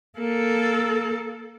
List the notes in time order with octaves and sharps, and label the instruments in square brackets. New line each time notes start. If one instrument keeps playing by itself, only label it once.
[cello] A#3 A4